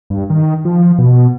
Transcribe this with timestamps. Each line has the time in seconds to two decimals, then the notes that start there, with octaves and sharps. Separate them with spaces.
0.10 G2
0.30 D#3
0.65 F3
0.98 B2